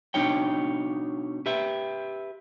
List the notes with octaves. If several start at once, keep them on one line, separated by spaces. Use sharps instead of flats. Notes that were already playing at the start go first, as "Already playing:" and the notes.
B2 D4 D#4 C#5 G5
G4 B4 E5